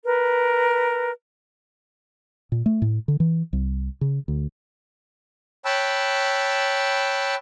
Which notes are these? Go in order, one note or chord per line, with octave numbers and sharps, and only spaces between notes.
A#4 B4
A#2
A3
A2
D3
E3
C2
C#3
D2
C#5 G5 A5 B5 E6 F#6